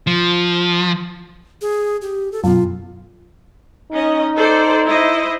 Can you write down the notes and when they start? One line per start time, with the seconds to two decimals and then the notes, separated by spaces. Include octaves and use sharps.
0.07 F3
1.61 G#4
2.02 G4
2.32 A4
2.44 F#2 B2 F4
3.92 C#4 D#4 D#5
4.35 A4 C5 D5
4.87 E4 C5 D#5